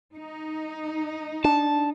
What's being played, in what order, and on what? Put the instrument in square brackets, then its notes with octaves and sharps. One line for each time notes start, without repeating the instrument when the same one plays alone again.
[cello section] D#4
[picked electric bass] D4 [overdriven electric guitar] A5